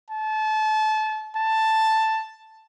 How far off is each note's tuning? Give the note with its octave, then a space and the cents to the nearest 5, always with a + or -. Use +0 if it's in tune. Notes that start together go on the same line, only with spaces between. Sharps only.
A5 -30
A5 +5